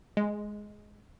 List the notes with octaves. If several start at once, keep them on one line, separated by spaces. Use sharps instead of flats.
G#3